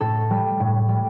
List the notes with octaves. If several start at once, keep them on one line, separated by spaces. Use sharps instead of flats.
A2 A4
G3
A2
G3